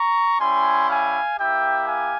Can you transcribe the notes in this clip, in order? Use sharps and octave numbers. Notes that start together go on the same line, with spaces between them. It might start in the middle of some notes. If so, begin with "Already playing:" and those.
Already playing: A#5 C#6
G3 C#4 E4 G#5 C6
F5 G#5
A#3 E4 G4 E5 G5
F5 G#5